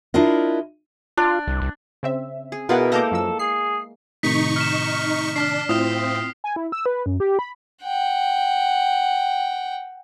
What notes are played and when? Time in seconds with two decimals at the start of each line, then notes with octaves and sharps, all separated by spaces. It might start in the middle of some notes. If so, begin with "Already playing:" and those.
0.14 D4 E4 F4 A#4 D#5
1.17 D4 F4
1.48 C2
1.62 C2
2.03 C#3 C4 E5
2.52 G#4
2.69 B2 E4 F4 G#4 A#4 B4 F#5
2.92 G#3 A#3 A4 A#4 D6 G6 A#6
3.11 F#2 F3 E6
3.39 G#4 C7
4.23 A2 C3 D#3 D#4 C#6 B6
4.56 F6 B6 E7
5.36 D4 F6 B6 C7
5.69 A2 C4 E4 F4 D#6 F6
6.44 G#5
6.56 E4
6.72 E6
6.86 B4
7.06 F#2
7.20 G4
7.39 B5
7.83 F#5 G5